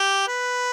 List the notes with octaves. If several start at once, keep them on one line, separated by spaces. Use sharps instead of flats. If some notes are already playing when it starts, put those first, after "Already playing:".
Already playing: G4
B4